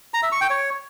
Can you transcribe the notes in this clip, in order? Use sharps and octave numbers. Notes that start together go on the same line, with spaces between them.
A#5
E5
C#6
G5
C#5